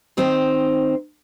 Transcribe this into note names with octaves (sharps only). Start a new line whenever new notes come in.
D#3 C4 D#4 C5